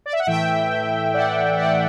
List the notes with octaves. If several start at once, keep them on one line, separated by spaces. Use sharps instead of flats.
D5
E5
F#5
A2 E3 A3 E5 G5
D5 F#5
D5 F#5